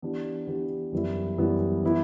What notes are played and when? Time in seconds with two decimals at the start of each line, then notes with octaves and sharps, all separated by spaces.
0.02 E3 B3 D4 G4
0.47 E3 B3 D4 G4
0.92 F#2 E3 G3 B3 E4
1.38 F#2 E3 G3 B3 E4
1.83 E3 B3 E4